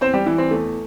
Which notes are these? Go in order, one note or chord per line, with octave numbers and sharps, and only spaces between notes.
E2 C4 C5
G3 G4
E3 G3 E4
C4
E2 A3